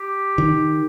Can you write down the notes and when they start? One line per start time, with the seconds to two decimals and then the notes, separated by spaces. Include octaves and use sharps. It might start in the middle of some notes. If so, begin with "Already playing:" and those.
Already playing: G4
0.38 D#3